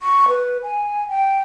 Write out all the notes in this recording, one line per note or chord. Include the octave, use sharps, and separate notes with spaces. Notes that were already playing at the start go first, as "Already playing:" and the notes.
C#6
B4
G#5
G5